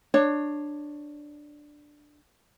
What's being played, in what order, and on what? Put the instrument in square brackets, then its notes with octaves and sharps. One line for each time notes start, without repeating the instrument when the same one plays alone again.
[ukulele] D4 [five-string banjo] C#5